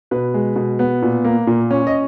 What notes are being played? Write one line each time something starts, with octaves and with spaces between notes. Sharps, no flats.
B2 B4
G#3
B2
B3
A#2
A#3
A#2
C#4
D#5